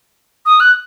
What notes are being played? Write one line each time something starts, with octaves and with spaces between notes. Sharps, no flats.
D#6
F#6